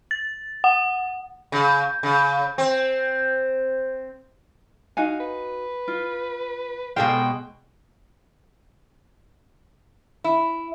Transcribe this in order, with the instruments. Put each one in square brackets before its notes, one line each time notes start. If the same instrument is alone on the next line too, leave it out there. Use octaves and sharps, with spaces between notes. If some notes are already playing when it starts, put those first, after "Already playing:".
[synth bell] A6
F#5
[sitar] C#3
C#3
C4
[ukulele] D#4 F#4 G#5 [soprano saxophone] F5
[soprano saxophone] B4
[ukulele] F4
[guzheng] B2 G#3 C5 [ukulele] A4 F5 [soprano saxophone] G5
[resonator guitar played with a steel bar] E4